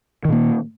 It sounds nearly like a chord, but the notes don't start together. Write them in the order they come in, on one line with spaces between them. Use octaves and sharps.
D#3 A#2 A#3